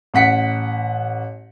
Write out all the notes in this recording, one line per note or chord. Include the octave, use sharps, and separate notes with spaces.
A1 F#5 B6 C#7